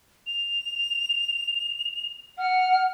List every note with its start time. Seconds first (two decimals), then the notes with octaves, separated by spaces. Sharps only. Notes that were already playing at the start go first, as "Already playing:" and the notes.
0.26 F7
2.38 F#5 F6